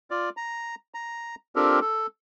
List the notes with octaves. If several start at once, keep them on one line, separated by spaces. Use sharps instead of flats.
F4 D5
A#5
A#5
C4 D4 F4 G4 A4 A#4
A4